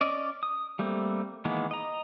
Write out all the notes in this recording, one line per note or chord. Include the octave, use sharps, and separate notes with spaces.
C#4 D5 D#5
D#6
G3 A3 A#3 C4
D#3 E3 G#3 A#3 B3
D#5 A#5